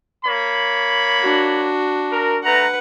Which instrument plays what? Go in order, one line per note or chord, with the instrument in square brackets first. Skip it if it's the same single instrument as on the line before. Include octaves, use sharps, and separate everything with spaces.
[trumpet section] A#3 C#5 B5
[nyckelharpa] D4 F#4
[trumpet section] A#4
[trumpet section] A3 A#5 [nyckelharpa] B4 F#5